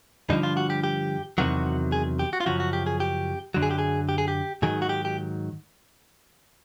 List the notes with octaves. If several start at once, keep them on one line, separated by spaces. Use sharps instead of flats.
G2 D3 F3 D#4
F4
F#4
G4
G4
E2 C3 D#3 F#3 F#4
G#4
G4
F#4
F4
F#2 C#3 F3 F#4
F#4
G4
G#4
G4
F#2 D3 F#3
G#4
G4
G#4
G4
G#4
G4
G#2 D#3 F#3 G#4
F#4
G4
G4